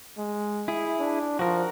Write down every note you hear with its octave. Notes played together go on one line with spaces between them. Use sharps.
G#3
E4 G#4
D4
F3 F#4 A#4